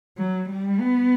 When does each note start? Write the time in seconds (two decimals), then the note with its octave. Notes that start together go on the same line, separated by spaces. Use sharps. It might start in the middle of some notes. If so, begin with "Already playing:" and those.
0.18 F#3
0.49 G3
0.80 B3